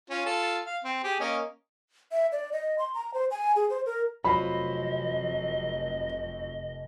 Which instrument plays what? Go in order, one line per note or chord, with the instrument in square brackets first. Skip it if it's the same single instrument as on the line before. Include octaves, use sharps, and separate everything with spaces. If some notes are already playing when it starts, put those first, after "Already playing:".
[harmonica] C#4 F4
F4 A4
F5
C4
G4 G#4
A#3 C#4 D#5
[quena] E5
D5
D#5
C6
A#5
C5
G#5
G#4
C5
A#4
[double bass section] F1 F2 [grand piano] F#3 F4 C5 [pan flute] D#5 [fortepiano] B5